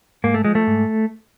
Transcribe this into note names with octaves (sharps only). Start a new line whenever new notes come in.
G#2 A#3
A3
F3 G#3
A3
G#2